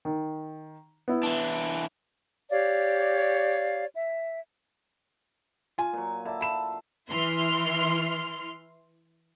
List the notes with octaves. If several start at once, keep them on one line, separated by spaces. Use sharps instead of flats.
D#3
B3 E4
E3 D4
G4 C#5 D5 F5
E5
F4 G#5
A#2 F#3
D3 E4 A5
F4 B5 E7
E3 E4 C6 F6